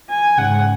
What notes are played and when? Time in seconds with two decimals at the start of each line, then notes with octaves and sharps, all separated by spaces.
0.10 G#5
0.38 G#2 C#3 F#5